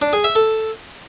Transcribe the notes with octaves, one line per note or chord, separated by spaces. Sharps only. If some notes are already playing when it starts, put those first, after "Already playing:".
D4
G#4
E5
A4